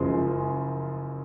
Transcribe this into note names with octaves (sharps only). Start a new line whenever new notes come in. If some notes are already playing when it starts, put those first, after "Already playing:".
Already playing: F#1 F#2 C#3 F3 G#3 C6